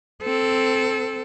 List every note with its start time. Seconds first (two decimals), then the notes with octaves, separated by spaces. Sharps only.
0.23 C4 A4